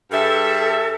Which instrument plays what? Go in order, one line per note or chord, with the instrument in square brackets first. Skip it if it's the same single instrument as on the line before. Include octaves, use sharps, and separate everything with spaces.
[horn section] G2 G#4 E5 [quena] A4